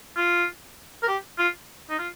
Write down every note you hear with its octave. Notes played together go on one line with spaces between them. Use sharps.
F4
A#4
G4
F4
D#4
F4